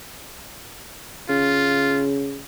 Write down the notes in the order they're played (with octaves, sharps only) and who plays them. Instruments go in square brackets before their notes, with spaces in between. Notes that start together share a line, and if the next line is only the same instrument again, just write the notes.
[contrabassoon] C#3 [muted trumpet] F4